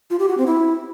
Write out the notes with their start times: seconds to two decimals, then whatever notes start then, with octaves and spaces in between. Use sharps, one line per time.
0.10 F4
0.19 G4
0.29 F#4
0.38 C4
0.47 E4